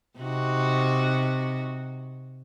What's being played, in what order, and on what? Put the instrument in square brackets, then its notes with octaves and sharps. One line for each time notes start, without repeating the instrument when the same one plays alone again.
[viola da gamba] C3 D#4 F#4